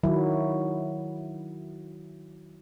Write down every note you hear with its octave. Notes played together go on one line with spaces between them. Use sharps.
D#3 F#3 E4